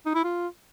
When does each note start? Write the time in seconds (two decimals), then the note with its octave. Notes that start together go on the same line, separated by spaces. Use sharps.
0.06 D#4
0.15 E4
0.24 F4